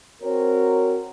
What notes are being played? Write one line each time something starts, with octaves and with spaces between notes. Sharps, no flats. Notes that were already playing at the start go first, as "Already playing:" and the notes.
C4 F#4 A#4 C#5